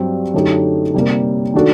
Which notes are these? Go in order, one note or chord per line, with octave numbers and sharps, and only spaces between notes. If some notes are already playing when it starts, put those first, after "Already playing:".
Already playing: G2 F#3 C4 G4
F#2 D3 A3 D#4 G4
C3 G3 A#3
D#3 A3 D4 F#4 A4